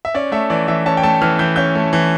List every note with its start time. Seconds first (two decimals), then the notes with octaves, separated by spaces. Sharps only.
0.05 E5
0.14 C#4 D5
0.32 A3 E5
0.50 E3 D5
0.68 E3 E5
0.86 C#4 A5
0.97 G5
1.03 A3 A5
1.22 E3 F6
1.39 E3 G6
1.56 C#4 G6
1.75 A3
1.93 E3